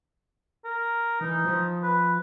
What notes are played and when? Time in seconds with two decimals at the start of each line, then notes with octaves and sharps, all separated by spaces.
0.65 A#4
1.21 E3 D#4
1.45 F3
1.83 B4